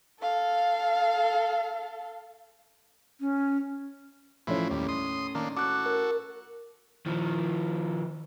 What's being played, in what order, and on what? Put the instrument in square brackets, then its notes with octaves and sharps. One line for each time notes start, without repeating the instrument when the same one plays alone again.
[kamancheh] A4 F5
[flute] C#4
[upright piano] A2 C#4 [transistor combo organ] E3 F3 E4
[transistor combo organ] D#2 G3
C6 D#6
D#3 A#3 D4
[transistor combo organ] F#4 A4 [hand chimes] D6 F#6
[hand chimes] A#4
[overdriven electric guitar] D#3 F3